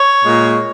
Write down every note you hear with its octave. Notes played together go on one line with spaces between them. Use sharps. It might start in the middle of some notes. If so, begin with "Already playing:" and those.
Already playing: C#5
A#2 G#3